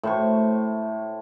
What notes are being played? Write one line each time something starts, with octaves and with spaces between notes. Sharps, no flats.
A2 C5 C#6